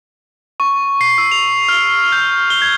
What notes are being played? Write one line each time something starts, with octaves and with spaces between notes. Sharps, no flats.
C#6
C7
E6
F7
F6
G6
G7
G#6